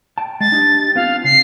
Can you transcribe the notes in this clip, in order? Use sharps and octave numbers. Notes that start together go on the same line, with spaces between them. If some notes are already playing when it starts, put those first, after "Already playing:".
G5 A5
G#3 A6
D4 D#4 G4
B3 C4 F4 F5
C#3 C7